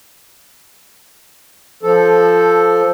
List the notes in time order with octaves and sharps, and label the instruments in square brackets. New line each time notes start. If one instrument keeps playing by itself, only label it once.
[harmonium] F3 A4